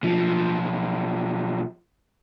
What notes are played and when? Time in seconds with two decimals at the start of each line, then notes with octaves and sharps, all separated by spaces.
0.03 B1 F3